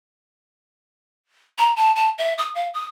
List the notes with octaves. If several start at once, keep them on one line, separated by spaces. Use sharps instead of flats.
A#5
A5
A5
E5
D#6
F5
D#6